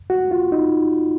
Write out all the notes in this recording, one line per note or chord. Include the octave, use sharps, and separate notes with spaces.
F#4
F4
D#4